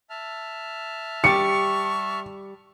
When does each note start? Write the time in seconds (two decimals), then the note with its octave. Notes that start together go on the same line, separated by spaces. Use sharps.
0.10 E5 A5 F6
1.24 G3 G4 C#6 C#7